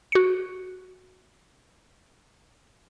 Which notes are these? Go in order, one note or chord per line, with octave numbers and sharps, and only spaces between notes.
F#4 C#7